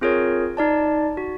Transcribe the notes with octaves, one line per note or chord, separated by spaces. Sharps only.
C4 F4 G#4 A#4 C#5
D#4 D5 A5
F#4